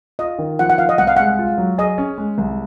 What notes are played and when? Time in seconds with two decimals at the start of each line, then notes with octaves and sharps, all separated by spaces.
0.19 F4 D#5
0.39 D#3
0.59 F3 F#5
0.70 F#5
0.78 F3 F5
0.89 D#5
0.98 C2 F#5
1.07 F5
1.17 G#3 F#5
1.39 F4
1.58 F#3
1.78 G#4 D#5
1.98 C#4
2.18 G#3
2.38 C2